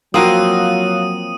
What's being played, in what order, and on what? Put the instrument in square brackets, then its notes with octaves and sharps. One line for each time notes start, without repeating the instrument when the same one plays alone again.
[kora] F3 A#3 C4 [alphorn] F#3 [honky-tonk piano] F4 F#4 [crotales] D#6 D#7